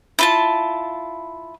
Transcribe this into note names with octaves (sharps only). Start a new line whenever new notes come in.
E4 F4 A5